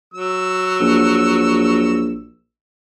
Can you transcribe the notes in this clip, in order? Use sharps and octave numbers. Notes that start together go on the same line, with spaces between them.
F#3 E6
A#1